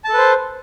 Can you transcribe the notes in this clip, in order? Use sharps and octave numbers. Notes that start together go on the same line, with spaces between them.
A4 B4 C5 A5